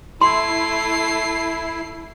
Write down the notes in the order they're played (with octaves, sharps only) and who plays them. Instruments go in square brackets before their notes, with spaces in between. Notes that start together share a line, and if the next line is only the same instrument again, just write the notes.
[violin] A3 C7 [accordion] E4 [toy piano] C6